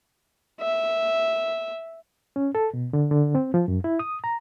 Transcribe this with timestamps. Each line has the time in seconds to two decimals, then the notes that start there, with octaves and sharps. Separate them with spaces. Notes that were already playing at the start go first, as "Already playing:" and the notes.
0.61 E5
2.36 C#4
2.55 A4
2.74 B2
2.93 D3
3.11 D3
3.35 C4
3.54 F3
3.68 F#2
3.84 E4
3.99 D#6
4.24 A#5